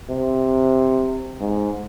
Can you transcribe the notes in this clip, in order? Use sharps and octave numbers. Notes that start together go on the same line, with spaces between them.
C3
G#2